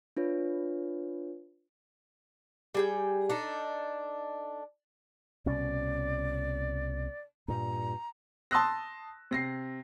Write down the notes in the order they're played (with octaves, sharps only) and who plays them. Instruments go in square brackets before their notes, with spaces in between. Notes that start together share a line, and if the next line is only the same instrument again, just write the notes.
[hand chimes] D4 F4 B4 C#5
[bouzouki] G3 G#4 G5
D4 D#4 A4
[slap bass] C2 B2 C#4 [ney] D5
[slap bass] G2 A#2 [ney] A#5
[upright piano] A5 C6 D#6 E6 F#6 A#6
C3 A#6 C7